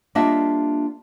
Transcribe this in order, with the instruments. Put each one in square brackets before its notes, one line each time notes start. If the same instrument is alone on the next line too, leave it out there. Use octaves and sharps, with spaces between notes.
[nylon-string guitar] G3 A#3 D4 F4 D#5 E5